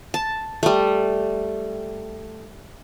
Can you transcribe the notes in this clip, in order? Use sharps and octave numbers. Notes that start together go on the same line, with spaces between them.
A5
G3 A3